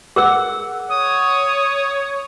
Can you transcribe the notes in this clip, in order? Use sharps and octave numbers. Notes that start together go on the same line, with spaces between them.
G#4 A#4 F#5 E6
C#5 D#6